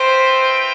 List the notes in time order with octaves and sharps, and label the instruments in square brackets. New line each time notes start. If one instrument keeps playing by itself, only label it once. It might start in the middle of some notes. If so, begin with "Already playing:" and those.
Already playing: [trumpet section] C4 F4 B4 E5 G5 [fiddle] C5